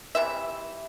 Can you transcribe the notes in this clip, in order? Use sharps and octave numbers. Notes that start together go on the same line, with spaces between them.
C3 E3 E5